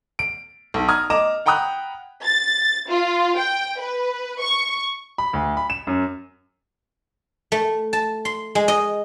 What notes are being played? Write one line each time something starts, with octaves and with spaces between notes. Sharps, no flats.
D7
B1
A#5 D#6 F6 G#6
D#5 A#5 D6 E7
F#5 G5 A#5 B5 D#6 F#6
A6
F4
G5
B4
C#6
B5
D2
B5
E7
F#2
A3
A5
C6
G#3
D#5